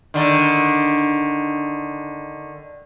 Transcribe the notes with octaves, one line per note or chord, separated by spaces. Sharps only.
D3 D#3